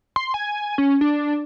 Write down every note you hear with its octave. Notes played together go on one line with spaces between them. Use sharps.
C6
G#5
C#4
D4